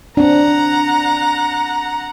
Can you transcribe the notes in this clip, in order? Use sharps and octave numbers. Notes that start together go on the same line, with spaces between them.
C4 D4 F#5 A#5